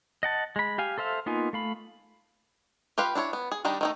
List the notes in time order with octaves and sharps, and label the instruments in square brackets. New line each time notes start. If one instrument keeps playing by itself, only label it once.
[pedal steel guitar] D#5 F#5 A5
G#3 B5
G4 F5 G#5
A4 C5 E5 F5
A#3 B3 D#4 F4 G#5
A3 F5 B5
[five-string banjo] F4 G4 B4 F5
D4 E4 C5 C#5
B3
G#4
D#3 G3 D4 D#4
D#3 A3 D#4